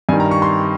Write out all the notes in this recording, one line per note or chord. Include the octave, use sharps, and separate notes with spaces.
G2 D#3 G#5
A#5
C#6
C6